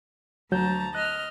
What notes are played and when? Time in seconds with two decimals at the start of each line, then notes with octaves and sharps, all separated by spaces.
0.52 D2 F#3 A5 A#5 G6
0.95 D#5 F6 F#6